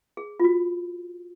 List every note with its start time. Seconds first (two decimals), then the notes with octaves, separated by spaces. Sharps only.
0.17 G#4
0.40 F4
0.44 F#4